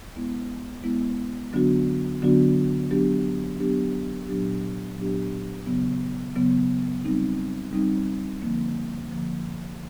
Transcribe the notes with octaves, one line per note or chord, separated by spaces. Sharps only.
G#3 B3 E4
G#3 B3 E4
D3 F#3 B3 D4 F#4
D3 F#3 B3 D4 F#4
F#3 B3 D4 G4
F#3 B3 D4 G4
A#2 F#3 B3 D4 G4
A#2 F#3 B3 D4 G4
C#3 F#3 B3
C#3 F#3 B3
G3 C4 D#4
G3 C4 D#4
D3 F3 A#3
D3 F3 A#3